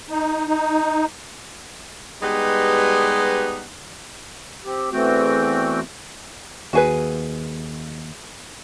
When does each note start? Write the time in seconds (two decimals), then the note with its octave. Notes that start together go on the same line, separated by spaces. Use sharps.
0.10 D#4
0.47 D#4
2.22 G3 G#3 B3 D#4 G4 B4
4.64 C4 G4
4.92 E2 E3 A3 C4 F#4 G5
6.73 D#2 F#4 G#4 B4